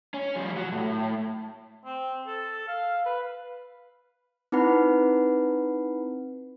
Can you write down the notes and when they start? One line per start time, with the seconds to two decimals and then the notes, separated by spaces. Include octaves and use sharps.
0.14 C#4
0.36 F3 G3
0.57 F#3
0.72 A2
1.85 C4
2.27 A4
2.68 F5
3.06 B4
4.52 C4 D#4 E4 B4 F#5 B5